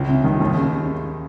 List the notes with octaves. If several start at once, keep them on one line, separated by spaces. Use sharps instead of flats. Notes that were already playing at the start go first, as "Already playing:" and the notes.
Already playing: C#2
C3
D#3
D#2
C#3